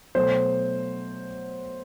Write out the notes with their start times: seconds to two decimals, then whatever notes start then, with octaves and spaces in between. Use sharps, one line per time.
0.15 B2 F#3 A3 C5